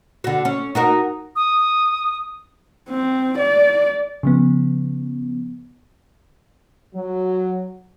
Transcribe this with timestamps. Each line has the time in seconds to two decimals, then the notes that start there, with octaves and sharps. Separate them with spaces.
0.24 D3 F#4
0.45 C#4
0.75 D#4 F#4 A#4
1.36 D#6
2.89 C4
3.39 D5
4.23 C#3 F3 B3
6.95 F#3